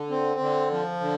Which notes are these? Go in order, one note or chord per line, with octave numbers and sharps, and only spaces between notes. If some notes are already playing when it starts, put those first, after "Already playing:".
Already playing: D3
C4
D3
F3
D3